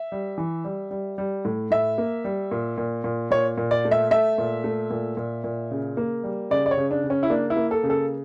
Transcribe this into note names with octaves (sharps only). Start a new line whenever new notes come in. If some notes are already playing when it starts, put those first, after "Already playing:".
Already playing: E5
G3
E3
G3
G3
G3
A2
A2 E5
A#3
G3
A#2
A#2
A#2
A#2 C#5
A#2
D5
A3
E5
A3 E5
A#2
A3
A#2
A#2
A#2
C#3
A#3
G3
C#3 D5
D5
C#5
C#3
D4
C#3
C#4
E4
A#3 D4
E4
A#3
A4
C#3
A4